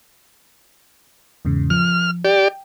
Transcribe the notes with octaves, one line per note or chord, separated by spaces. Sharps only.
E2 G#2 C#3
F3 F6
G4 D5 G5